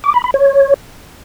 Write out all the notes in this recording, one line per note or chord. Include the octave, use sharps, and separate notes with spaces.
D6
B5
B5
C#5